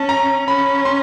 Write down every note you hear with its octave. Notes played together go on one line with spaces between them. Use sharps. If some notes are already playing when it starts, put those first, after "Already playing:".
Already playing: C#4 A5
A#5
C#4 B5
C6